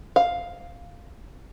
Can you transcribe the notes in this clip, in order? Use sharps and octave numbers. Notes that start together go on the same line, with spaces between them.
F5